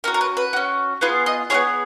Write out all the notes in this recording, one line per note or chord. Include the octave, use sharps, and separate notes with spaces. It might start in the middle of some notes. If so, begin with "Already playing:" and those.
C#4 F#4 A#4
A#4
B4
B4
C#4 F#4
B3 F4 G#4 B4
D#5
B3 F4 G#4 C#5